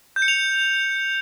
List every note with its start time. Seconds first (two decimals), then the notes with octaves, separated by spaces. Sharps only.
0.16 G6
0.22 C#7
0.28 F7